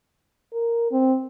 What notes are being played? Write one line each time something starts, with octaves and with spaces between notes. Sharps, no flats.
A#4
C4